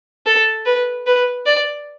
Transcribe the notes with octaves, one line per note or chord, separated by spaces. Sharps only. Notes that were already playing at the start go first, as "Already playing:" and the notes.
A4
B4
B4
D5